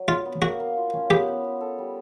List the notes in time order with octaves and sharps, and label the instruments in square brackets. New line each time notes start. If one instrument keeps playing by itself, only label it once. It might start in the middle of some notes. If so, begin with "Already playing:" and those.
Already playing: [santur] F#3
[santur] D4 [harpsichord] F4
[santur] B3
[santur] A#3 [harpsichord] F#4
[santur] A#3
F4
C#4
[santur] B3 [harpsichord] G4
[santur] B3
B3
A4
G3